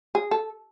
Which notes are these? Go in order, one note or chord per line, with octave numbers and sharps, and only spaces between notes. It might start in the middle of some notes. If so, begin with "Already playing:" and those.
G#4
A4